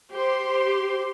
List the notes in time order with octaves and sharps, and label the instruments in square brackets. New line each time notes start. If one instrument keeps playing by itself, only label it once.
[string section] G4 C5 C6